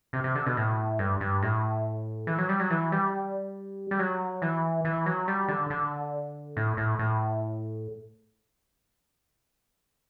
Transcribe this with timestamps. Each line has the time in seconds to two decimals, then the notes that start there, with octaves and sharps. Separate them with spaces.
0.13 C3
0.24 C3
0.35 D3
0.46 B2
0.57 A2
0.99 G2
1.20 G2
1.43 A2
2.27 E3
2.38 F#3
2.49 G3
2.60 F#3
2.70 E3
2.92 G3
3.91 G3
3.99 F#3
4.42 E3
4.85 E3
5.06 F#3
5.28 G3
5.48 D3
5.70 D3
6.57 A2
6.77 A2
6.99 A2